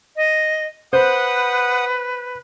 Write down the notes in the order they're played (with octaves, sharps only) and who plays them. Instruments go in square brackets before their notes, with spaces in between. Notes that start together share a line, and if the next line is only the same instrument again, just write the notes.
[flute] D#5
[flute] B4 [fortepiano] C5 [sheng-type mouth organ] F#5 D#6